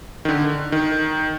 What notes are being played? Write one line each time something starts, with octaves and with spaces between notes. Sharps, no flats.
D#3
D3
D#3